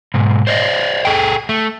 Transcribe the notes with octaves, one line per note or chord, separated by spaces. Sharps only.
G#2 B2
C5 D5 D#5
G#4 A4 G5
A3